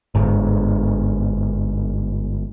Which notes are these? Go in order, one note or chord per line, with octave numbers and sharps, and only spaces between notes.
G1 G#2